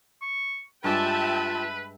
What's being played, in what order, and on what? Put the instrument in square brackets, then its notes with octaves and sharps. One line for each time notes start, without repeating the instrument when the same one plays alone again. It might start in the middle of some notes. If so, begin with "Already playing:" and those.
[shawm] C#6
[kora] G2 G#3 D5 [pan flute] F4 [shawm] B4 [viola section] E5 G5 A5